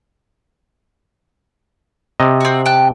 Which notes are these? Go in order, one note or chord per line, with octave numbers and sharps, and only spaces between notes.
C3 D#5
C4 F#4
G5 A5 F#6